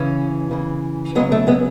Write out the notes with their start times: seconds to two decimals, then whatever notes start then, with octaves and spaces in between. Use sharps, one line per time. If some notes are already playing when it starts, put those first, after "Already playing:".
Already playing: C#3 E3 C#4
0.51 C#3 E3
1.15 F#3 G#3 B3
1.19 C#3
1.32 A3
1.47 G#3 B3